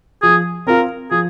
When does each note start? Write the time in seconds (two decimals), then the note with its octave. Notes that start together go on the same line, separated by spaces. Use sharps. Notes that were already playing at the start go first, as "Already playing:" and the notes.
0.22 F3 G#4
0.67 C4 F4 A#4
1.11 F3 G#4